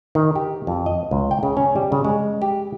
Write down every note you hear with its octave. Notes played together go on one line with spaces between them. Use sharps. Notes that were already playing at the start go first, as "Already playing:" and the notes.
D#3
G4
F2
D#5
C#2
G5
C#3
C#4
G3
C#3
G#3
G4